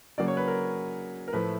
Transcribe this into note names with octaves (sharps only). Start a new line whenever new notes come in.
C#3 F#3 A#3 D5
C#5
B4
A#4
A#4
A2 F3 A3 B4